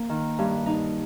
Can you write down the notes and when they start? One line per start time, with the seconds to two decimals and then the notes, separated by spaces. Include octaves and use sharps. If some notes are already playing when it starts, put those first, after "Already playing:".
Already playing: A#3
0.09 D#3
0.39 G2
0.66 D#4